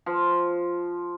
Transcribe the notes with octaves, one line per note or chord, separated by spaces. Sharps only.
F3